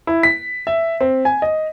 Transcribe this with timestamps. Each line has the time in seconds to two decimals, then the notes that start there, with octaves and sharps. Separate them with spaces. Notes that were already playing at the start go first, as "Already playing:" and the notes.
0.07 E4
0.23 B6
0.67 E5
1.00 C4
1.25 G#5
1.42 D#5